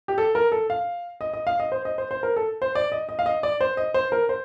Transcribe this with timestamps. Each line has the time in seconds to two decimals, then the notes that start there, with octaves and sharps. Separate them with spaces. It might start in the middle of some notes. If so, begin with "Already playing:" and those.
0.08 G4
0.18 A4
0.35 A#4
0.52 A4
0.70 F5
1.21 D#5
1.33 D#5
1.47 F5
1.60 D#5
1.72 C5
1.85 D#5
1.98 C5
2.11 C5
2.23 A#4
2.36 A4
2.62 C5
2.75 D5
2.92 D#5
3.09 D#5
3.19 F5
3.26 D#5
3.43 D5
3.61 C5
3.77 D#5
3.94 C5
4.12 A#4
4.29 C5